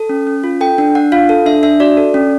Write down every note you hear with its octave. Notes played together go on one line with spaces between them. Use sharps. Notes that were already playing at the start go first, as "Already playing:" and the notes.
Already playing: A4
C#4
C#4
F4
A4 G5
D4
D4 F#5
F4 F5
A4
D4 E5
D4 E5
F#4 D5
A4
C#4